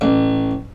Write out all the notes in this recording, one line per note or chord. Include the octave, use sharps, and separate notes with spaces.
A1